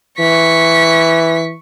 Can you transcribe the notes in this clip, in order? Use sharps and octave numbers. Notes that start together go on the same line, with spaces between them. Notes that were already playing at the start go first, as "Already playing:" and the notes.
E3 C#6 B6